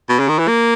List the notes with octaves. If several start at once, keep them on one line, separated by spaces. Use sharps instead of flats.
B2
C#3
D#3
E3
A#3